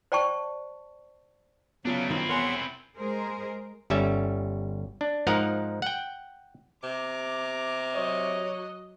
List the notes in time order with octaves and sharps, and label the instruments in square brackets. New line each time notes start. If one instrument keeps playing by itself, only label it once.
[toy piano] C5 D5 G5 A5 C#6
[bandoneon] C#3 F#3 [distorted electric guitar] A3 D4 [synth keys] B3 F4
[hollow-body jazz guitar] F#2 D#3 F3 [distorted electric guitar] C4 E4
[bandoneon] E2 F#5 C6 [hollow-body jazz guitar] A#4 C#5 G#5
[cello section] G#3 G#4 A#4 C5
[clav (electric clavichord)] G1 G3 C#4 E5
D4
G#2 F3 D#4 A#4 F5 F#5
F#5 G5
[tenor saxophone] C3 [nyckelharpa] A#5 D6
[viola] F#3 D#5 [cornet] C#5